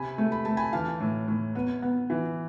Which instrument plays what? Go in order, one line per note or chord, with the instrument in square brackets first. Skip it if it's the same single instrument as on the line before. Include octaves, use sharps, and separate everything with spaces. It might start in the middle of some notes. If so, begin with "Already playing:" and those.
Already playing: [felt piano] C3 G#5 B5
A3
B5
A3 A5
G#5 B5
E3 F5 A5
A2
A2
B3
B3
E3